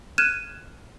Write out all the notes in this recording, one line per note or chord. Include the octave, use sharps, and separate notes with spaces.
F6 F#6 G#6 D#7 E7